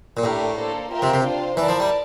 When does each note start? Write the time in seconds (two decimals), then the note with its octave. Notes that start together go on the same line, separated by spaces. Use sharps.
0.17 A#2
0.24 A2 A3 D4 G4 A#4
0.57 A#3 D4 A4 C5
0.91 F4 A#4 E5 G5
1.02 C3
1.14 C3
1.24 D4 F4 C5
1.57 E3 E4 A#4 D5 A5
1.69 F3
1.80 G3